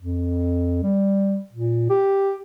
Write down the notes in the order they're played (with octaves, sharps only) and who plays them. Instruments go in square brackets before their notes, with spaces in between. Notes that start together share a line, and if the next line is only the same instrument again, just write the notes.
[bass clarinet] F2
G3
A#2
G4